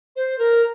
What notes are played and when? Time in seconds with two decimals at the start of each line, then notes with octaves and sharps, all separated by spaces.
0.16 C5
0.39 A#4